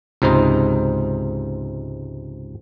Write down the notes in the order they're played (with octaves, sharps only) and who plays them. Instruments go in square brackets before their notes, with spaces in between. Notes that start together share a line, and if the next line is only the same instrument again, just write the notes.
[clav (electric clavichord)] C#2 G#2 C3 D#4 C5